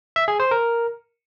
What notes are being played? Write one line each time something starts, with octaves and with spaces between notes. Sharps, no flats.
E5
G#4
C5
A#4